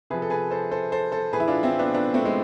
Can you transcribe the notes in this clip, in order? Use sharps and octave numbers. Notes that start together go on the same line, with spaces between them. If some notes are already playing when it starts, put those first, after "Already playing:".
C3 F3 G#4 B4
A4
G#4 B4
A4 C5
A4 C5
A4 C5
A4 C5
A2 E3 G#4 B4
E4
D4 F4
C4 E4
B3 D4
B3 D4
A3 C4
G#3